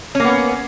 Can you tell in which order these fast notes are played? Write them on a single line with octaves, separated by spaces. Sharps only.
C#4 A#3 B3